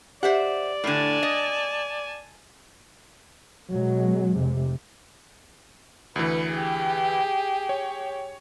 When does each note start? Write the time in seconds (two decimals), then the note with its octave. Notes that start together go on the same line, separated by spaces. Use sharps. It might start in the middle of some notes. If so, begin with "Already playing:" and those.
0.23 G4 C5 D5 E5 F#5
0.84 A2 D3 G#5 A5
1.23 D#5
3.72 B2 F#3 G#3
4.35 F1 C3
6.16 D2 E3 B4 C#7
6.51 G4 G#4
7.69 C#5